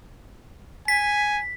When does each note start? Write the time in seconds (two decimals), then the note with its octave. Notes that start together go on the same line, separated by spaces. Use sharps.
0.88 G#5 B6